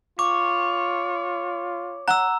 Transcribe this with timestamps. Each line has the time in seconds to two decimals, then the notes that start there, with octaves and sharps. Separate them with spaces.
0.19 F4 C#5 D6
2.08 F#5 A#5 E6 F#6